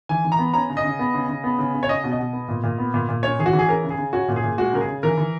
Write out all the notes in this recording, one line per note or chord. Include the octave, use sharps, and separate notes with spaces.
E3 G#5
E3
A#5
B3
C#4 A#5
C#3
D#5
C#3
B3
C#3
C#3
B3
C#3
C#3
C#5
C#4 D#5
B2
D#5
B2
B3
A#2
A#2
B3
A#2
A#2
C#4 C#5
E3 G#4
F#4
E3
G#4
C#4 A#4
C#3
G#4
C#3
C#4 F#4
A#2
G#4
A#2
G#3 F#4
C#3 A#4
G#4
C#3
E3 A#4
E3